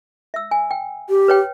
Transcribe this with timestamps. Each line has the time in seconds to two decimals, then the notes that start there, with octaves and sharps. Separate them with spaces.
0.34 E5 E6
0.51 G#5
0.71 G5
1.09 G4
1.28 B4 C#5 G5